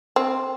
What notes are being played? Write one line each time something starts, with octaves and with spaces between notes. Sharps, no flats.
C4